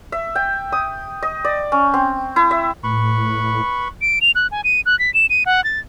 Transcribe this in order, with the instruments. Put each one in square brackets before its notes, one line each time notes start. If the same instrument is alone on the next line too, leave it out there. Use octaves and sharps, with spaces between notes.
[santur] E5
G5
D#6
D#5
D5
C#4
C4
E4
E5
[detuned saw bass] A2 [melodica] B4 B5 C#6
[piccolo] D7
F7
F#6
G#5
D#7
F#6
B6
E7
D#7
F#5
A6